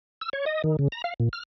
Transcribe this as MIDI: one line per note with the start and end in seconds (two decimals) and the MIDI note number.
0.21 0.29 88
0.33 0.45 73
0.46 0.62 75
0.64 0.76 51
0.79 0.88 49
0.92 1.02 82
1.04 1.14 77
1.20 1.29 46
1.33 1.43 89